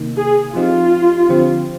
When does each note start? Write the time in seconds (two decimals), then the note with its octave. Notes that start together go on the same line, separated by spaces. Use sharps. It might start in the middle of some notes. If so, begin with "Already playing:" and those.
Already playing: C3 D#3 A#3 D#4
0.17 G#4
0.55 F3 C4 D#4 F4 G4
1.29 D3 F3 C4 G4 C5